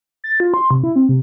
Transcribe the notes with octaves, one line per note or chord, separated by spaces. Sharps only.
A6
F4
C6
C3
E4
C4
C3